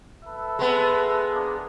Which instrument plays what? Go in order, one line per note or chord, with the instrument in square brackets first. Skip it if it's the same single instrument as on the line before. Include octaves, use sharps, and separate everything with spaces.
[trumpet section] A4 B4 E5
[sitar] G#3 B3
[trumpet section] A#3 D4 G#4